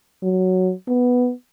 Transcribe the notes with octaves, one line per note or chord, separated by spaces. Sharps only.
F#3
B3